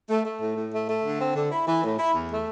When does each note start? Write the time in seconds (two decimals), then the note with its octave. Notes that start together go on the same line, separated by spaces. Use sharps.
0.09 A3
0.25 A3
0.41 A2
0.57 A2
0.72 A3
0.88 A3
1.04 D3
1.19 C4
1.35 D3
1.51 E4
1.67 E3
1.83 A2
1.99 E4
2.14 E2
2.31 A3